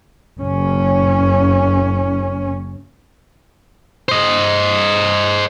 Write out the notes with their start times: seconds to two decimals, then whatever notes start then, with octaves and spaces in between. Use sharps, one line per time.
0.37 F#1 C#4
4.09 C5 D#5